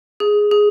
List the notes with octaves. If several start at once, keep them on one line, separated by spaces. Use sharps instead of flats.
G#4
G#4